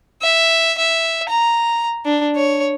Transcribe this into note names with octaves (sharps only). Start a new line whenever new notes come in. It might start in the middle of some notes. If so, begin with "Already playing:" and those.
E5
E5
A#5
D4
C#5